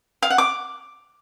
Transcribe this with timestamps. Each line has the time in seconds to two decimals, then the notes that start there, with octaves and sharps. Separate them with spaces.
0.22 F5
0.30 F#5
0.38 D6